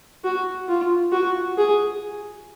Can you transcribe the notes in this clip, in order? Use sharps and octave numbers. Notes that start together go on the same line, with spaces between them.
F#4
F4
F#4
G#4